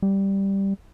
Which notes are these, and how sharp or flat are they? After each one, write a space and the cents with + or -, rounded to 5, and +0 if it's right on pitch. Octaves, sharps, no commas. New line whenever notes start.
G3 +0